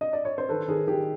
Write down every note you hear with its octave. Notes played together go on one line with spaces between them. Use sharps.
D#5
D5
C#5
C5
D#3 A4 B4
D#3 G#4 A#4
D#3 G4